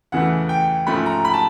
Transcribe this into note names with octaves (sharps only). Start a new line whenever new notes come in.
E2 C#3 E3 A3 F#5
G5
G#2 F3 A3 C#4 B5
A#5
B5
A5